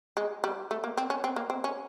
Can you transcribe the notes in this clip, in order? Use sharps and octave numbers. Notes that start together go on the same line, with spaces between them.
G#3
G3
A3
A#3
C4
C#4
C4
A#3
C4
C#4